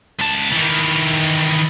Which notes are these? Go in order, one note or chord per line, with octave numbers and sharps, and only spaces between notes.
C#2 A5
D#3 E3